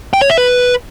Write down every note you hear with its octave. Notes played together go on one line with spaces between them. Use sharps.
G5
C#5
E5
B4